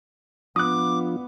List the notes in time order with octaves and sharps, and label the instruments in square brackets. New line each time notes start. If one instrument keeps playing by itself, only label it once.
[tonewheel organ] F3 D4 F4 [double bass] B3 [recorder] D6 [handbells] D#6 F#6